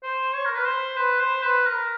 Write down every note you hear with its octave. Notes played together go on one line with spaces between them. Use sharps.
C5
C#5
A#4
B4
C5
B4
C5
B4
A#4